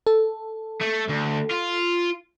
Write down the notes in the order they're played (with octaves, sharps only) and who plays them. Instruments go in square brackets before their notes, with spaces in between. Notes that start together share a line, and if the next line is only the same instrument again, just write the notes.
[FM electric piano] A4
[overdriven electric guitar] A3
D2
F4